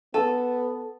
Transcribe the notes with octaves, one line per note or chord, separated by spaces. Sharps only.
B3 A4 A5